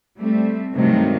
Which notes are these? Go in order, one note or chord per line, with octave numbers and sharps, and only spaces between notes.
G3 A3 C4
G2 C3 D#3 F#3 G#3 A3